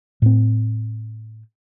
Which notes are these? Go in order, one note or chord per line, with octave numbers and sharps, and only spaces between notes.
A2 C4